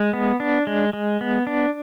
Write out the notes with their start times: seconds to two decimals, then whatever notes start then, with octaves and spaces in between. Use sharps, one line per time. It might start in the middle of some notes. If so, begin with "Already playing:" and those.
Already playing: G#3
0.13 B3
0.40 D4
0.67 G#3
0.93 G#3
1.21 B3
1.47 D4